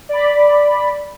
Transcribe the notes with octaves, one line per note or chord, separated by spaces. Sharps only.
D5 B5